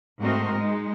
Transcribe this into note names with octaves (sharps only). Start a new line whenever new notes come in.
G#2 A3 C4 F#4 A#4 D#5
G#3 D#4